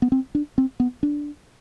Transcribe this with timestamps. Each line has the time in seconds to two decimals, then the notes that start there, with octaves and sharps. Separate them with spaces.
0.02 B3
0.12 C4
0.35 D4
0.58 C4
0.80 B3
1.03 D4